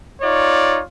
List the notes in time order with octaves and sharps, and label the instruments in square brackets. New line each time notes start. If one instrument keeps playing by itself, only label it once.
[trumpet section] D#4 F4 C#5 D5